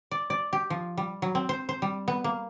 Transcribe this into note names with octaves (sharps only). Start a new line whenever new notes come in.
D5
D5
G4
F3
G3
F#3
C4
C5
C5
G3
B3
A#3